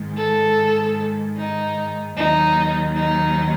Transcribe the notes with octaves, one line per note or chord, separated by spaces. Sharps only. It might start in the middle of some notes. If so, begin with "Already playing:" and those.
Already playing: G#2 D#3 G#3
A4
D#4
D#2 D#3 F#3 D#4
D#4